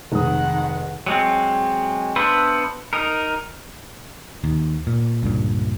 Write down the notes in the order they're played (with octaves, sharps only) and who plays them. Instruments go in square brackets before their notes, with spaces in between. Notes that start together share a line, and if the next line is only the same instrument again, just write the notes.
[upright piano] F1 G#3 D#6 [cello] D#3 F#5
[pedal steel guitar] F#3 G#3 C4
B3 D4 B4 C5 E5
D#4 A#4
[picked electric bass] D#2
A#2
C#2 G2 A#2